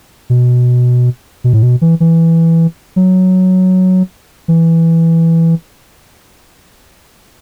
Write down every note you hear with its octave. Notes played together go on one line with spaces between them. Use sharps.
B2
B2
A2
B2
E3
E3
F#3
E3